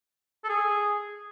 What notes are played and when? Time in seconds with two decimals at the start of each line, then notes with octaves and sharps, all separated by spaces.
0.44 A4
0.49 G#4